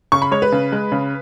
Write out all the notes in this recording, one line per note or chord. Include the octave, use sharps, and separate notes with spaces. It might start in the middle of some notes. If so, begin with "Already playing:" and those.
C#3 C#6
B5
G#3 C#5
B4
C#3
G#3
C#3